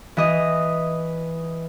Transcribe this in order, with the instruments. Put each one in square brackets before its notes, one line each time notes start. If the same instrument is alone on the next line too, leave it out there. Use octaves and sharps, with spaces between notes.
[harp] E3 D#5